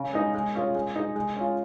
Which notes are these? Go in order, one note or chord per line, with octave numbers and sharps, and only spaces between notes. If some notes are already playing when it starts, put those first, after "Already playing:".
Already playing: C#3
G#3 D#4 G#4
G#3
C#4 F4 G#4
G#3
D#4 G#4
G#3
C#4 F4